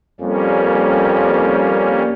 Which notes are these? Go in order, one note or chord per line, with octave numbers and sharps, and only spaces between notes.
F2 G3 A#3 C#4